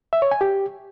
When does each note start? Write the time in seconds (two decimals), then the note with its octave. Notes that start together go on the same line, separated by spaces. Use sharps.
0.13 E5
0.22 C#5
0.31 G#5
0.41 G4